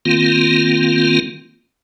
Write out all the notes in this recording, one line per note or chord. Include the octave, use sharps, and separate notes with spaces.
D#3 A#3 C4 F4